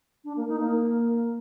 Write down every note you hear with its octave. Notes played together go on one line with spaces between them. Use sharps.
D4
A#3
D#4
A#3